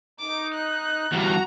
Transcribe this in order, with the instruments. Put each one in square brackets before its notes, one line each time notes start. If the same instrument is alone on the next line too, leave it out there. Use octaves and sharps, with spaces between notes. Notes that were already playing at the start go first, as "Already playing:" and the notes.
[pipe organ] D#4 [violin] D6
[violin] F#6
[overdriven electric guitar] E2 G2 [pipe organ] F#4 A#5